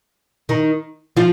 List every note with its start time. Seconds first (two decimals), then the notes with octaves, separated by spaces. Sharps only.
0.49 D#3 D#4
1.17 F3 F4